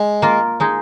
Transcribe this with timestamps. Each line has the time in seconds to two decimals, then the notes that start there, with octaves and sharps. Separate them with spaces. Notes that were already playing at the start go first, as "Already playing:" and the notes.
Already playing: G#3
0.22 A#3 F4 A#4
0.60 G#3 D#4 G#4